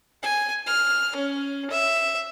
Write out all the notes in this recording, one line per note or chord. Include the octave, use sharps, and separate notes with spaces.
G#5
F6
C#4
E5